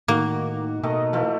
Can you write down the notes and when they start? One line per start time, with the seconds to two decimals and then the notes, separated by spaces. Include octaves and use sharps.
0.08 A2 D#3 A#3 F#4
0.83 B2 D#3 A3 D#5
1.13 E3 F3 A3